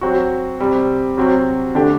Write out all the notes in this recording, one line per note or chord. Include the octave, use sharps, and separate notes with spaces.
F#3 C4 F#4
C3 G3 C4
C3 F#3 C4 F#4
D3 A3 D4 G4